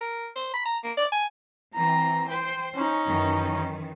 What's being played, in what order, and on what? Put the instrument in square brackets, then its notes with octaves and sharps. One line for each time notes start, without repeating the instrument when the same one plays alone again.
[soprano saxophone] A#4
C5
B5
A#5
A#3
D5
G#5
[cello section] E3 C4 [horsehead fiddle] A#5
[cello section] C5 [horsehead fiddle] G5
[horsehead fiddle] C#4 D#4
[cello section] F#2 D#3 E3